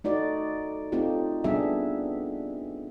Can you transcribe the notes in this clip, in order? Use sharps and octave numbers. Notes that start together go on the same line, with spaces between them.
A3 D#4 F#4 D5
A3 C4 D#4 F4 G4
G3 B3 D4 G#4 E5